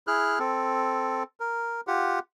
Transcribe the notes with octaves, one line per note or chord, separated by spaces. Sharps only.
E4 G#4 F6 F#6
C4 A4
A#4
F4 G4 F#5